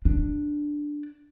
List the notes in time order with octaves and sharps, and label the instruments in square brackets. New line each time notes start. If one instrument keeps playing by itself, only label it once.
[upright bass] D4